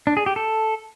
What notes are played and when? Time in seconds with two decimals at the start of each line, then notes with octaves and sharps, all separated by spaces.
0.07 D4
0.17 G#4
0.26 G4
0.36 A4